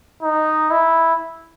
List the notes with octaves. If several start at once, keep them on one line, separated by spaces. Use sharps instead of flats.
D#4
E4